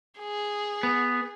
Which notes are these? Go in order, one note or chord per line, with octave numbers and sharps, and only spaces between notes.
G#4
B3